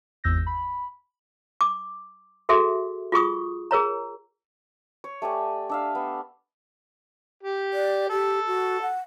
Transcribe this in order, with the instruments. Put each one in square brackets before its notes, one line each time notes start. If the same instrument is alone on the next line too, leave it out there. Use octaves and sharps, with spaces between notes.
[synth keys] G#1 E2 E6 G6 A#6
B5
[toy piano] D6
F#4 G#4 A4 E5
F4 G#4 C#6 D#6
G#4 A#4 C#5 A#5
[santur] C#5
A3 G4 D5 G#5
D4 E5 F5
B3
[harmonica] G4
[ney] D5
[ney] G4 [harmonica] A4
[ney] F#4
F#5